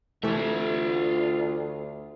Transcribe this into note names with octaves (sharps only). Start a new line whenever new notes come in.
D2 C3 E3 A3 F4 E5